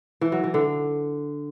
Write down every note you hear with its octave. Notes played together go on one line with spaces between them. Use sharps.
E3
F#3
E3
D3